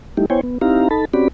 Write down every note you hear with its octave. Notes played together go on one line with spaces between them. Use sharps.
G3 A3 D#4 E4 G4
B3 E4 C5 C#5 G5 G#5
B3
C4 D#4 E4 G4 F5 A#5
D#4 A4 A5 B5
C4 C#4 F#4 G4 D5 B5